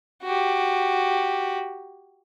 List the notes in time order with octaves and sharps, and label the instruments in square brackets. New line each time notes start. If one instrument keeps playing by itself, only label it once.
[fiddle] F#4 G4